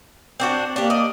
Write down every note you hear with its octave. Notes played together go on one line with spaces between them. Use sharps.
C4 D4 F#4
A#3 D4 G4
D5 D#5